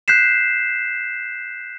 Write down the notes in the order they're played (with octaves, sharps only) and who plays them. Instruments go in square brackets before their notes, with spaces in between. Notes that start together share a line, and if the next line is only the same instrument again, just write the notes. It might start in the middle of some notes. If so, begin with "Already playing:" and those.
[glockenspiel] F#6 G6 B6 C7 E7